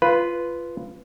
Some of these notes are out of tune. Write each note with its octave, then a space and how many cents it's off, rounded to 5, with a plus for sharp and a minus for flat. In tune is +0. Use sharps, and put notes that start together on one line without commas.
F4 -15 B4 +0